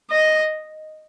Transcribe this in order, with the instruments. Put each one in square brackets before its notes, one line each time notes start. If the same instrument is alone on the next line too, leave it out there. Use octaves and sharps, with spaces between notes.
[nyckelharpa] D#5